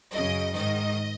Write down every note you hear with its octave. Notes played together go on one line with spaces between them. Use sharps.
F#2 C#3 D#5
G#2 D#3 D#5